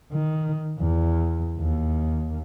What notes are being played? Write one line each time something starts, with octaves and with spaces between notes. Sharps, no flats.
D#3
E2
D#2